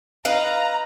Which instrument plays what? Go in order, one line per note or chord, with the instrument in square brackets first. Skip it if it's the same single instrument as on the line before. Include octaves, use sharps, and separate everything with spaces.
[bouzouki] D#4 B4 F5 [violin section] A#5